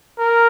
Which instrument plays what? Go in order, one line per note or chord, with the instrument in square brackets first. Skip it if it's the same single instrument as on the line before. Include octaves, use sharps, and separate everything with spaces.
[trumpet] A#4